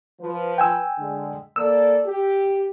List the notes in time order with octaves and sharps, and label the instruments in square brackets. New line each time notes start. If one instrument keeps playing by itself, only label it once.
[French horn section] F3 B4
[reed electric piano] G5 G#5 E6
[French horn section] D3 G#3
[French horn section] A#3 A4 D5 [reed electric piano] E6
[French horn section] G4